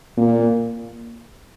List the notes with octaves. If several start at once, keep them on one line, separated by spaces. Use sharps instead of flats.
A#2 A#3
A#3